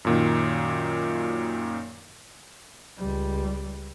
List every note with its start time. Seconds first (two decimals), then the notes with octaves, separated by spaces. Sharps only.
0.05 F#2 A#2 D#3
2.98 C#2 G3